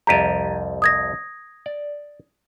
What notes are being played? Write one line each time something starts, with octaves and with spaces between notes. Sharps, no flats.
C2 F2 G4 A#5 D#7
D#6 G#6 A#6
D5